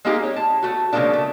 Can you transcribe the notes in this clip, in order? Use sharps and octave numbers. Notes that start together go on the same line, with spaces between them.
G#3 A#3 C4 D#4 G4 G#4
C#5
A5
A3 F#4
C#3 F3 F#3 G#3 A#3 D4
A3